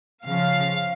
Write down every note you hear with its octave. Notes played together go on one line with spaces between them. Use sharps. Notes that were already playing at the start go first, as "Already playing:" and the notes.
C#3 F3 F5